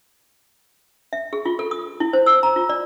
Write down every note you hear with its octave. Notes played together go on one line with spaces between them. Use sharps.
E5
G#4
F4
A4
D#6
E4
C5
E6
A#5
F4
D5